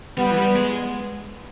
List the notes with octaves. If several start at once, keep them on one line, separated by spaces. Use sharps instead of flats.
G3 B3
E3
G3
G#3